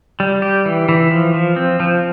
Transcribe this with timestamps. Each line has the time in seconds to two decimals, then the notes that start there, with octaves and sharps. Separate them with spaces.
0.20 G3
0.42 G4
0.65 E3
0.89 E3
1.11 F3
1.34 F3
1.56 C4
1.80 F3